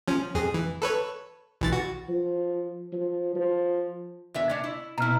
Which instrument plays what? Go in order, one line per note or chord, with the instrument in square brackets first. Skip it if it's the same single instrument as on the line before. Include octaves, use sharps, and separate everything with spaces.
[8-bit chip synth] F3 C#4
F2 G#4
E3
A4 B4 C#5
B1 E3 A6
F#4
[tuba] F3
F3
F3
[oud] E2 D4 E5
C#4 D4
E4
[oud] B2 E4 [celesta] A#5 F6